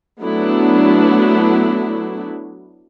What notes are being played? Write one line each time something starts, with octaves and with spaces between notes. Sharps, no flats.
F#3 A3 B3 D4 E4